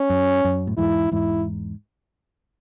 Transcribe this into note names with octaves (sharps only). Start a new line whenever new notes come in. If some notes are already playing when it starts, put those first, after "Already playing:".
Already playing: C#4
F#2
F#2
A2
E2 G#2 E4
E2 G#2 E4